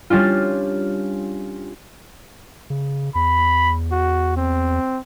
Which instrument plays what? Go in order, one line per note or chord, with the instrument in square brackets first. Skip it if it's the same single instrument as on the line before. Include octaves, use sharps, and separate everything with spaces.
[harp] G3 C#4 D4 F4
[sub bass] C#3
[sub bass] E2 [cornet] B5
[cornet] F#4
C4